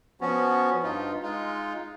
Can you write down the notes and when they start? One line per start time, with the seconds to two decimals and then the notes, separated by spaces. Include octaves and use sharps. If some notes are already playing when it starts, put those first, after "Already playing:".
0.21 F3 B3 C#4 F#4
0.83 G2 D#4 F4
1.23 G#3 D#4 F4